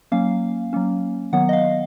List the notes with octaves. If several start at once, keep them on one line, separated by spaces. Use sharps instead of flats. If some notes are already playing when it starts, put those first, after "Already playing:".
F#3 A#3 C#4 F5
F#3 A#3 C#4
D#3 F#3 B3 F#5
D#5
F5